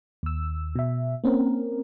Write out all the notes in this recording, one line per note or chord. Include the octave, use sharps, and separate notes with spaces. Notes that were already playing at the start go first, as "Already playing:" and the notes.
D#2 E6
B2 E5
A#3 C4 C#4 A#4